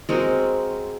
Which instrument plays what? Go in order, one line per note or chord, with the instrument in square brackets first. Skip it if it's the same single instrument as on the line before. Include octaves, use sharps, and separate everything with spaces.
[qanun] G#3 C4 F#4 A#4